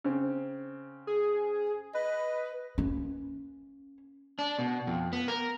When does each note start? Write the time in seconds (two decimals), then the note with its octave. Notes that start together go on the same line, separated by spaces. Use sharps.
0.04 C#3 C4
1.07 G#4
1.94 B4 D#5
2.78 A#3 C#4
4.39 D4
4.59 B2
4.87 F2
5.13 B3
5.28 A#4